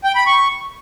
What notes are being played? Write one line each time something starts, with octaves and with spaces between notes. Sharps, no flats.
G5
B5
C#6